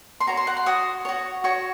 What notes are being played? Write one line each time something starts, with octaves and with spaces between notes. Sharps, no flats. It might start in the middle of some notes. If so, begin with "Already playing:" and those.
C6
F#4 C#5 A#5
C6
F#5
C6
F#4 C#5 D#6
F#4 C#5
F#4 C#5 C#6